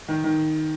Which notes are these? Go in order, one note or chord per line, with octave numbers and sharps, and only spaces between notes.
D#3
D#3